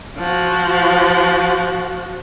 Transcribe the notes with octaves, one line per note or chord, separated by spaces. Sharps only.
F3 F#4